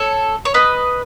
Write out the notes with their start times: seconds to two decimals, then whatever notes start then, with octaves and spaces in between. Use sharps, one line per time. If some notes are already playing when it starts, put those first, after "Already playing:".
Already playing: A4 C#5
0.45 C#5
0.54 B4 D#5